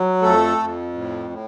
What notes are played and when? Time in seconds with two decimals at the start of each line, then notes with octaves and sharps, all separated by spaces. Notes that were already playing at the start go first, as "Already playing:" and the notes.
Already playing: F#3
0.22 F2 A3 A4
0.58 F2
0.94 A2
1.30 A2